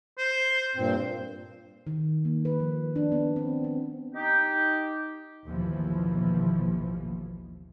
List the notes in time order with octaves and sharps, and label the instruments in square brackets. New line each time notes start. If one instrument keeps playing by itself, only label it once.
[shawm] C5
[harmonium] G2 A#2 C4
[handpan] D#3
A#3
B4
F3
D4
B3
C4
C4
[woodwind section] D#4 G4
[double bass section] A1 D#2 B2 E3 F3